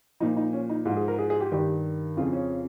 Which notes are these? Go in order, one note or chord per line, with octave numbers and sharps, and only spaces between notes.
A#2 F3 D#4
D#4
C#4
D#4
G#2 F3 F4
G#4
A#4
G#4
G#4
G4
G2 D#3 G4
F2 C#3 F3 F4
C#4